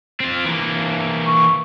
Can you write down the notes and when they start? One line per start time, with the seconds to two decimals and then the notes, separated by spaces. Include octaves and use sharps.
0.20 C4 F4
0.45 E3 A#3
1.26 C#6